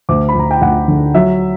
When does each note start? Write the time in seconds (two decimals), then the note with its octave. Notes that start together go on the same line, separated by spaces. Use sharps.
0.09 D2 D6
0.29 B5
0.35 D2 A#5
0.51 G5
0.62 D2 F#5
0.88 D3
1.15 F#3 E5